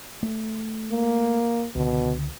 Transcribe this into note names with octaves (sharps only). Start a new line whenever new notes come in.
A3
A#3
C#2 B2 D3